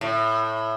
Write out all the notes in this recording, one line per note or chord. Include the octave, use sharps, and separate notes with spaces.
A2